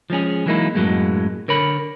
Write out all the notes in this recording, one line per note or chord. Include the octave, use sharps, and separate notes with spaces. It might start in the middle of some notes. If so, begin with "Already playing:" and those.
F3 G#3 C#4 G#4
E3 F#3 G#3 A#3 D#4 E4
F#2 A2 F#3 G#3 A#3
D3 A#4 C#5 B5